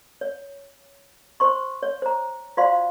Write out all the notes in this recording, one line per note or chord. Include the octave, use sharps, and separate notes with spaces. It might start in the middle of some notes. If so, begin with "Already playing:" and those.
C#5
C5 C6 C#6
C#5
C5 A#5
F4 F#4 C5 D5 F5 C6